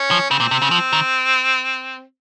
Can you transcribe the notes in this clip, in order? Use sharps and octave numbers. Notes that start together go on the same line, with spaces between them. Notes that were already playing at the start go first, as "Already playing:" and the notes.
Already playing: C#4
F3
C#3 C4
A#2
C3
C#3
F3
D#3